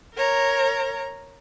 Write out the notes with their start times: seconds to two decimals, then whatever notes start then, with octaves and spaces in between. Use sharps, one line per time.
0.15 A#4 C#5 A#5